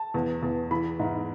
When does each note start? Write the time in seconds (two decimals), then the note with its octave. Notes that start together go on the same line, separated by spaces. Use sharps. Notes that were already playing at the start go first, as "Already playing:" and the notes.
Already playing: A5
0.14 E2
0.43 E2
0.71 E3 B5
0.99 G#2